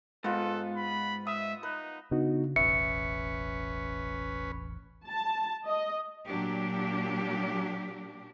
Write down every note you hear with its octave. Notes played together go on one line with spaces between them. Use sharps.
G#2 B3 F4 A4
B5
E5 D#6
D#4 B4
C#3 B3 D4 D#4 F#4
E1 A1 C#4 B4 E5 C#7
A5
D#5
A#2 F#3 D4 G4